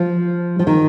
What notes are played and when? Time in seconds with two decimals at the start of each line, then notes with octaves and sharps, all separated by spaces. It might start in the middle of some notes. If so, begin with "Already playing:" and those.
Already playing: F3
0.59 F3
0.67 D#3